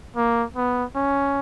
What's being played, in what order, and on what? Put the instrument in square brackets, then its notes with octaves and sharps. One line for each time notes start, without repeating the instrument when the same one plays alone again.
[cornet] A#3
B3
C#4